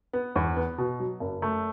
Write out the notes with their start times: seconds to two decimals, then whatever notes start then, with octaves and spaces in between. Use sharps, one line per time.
0.13 B3
0.36 E2
0.56 B3
0.78 B2
1.00 F#3
1.20 F#1
1.42 A3